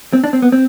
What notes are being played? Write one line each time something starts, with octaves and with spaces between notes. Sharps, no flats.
C4
D4
C4
B3
C4